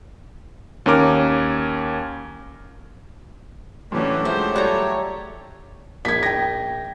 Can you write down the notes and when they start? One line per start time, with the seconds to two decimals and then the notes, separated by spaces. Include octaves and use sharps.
0.86 D#2 C#4 A#4 D6
3.92 F#2 A2 E3 F#3 A3 C#4 D4 G4
4.25 F3 G#3 G#4 C5 E5
4.56 G3 A4 C#5 E5 A#5 F#6
6.05 A#1 G#6 B6
6.23 G5 A#6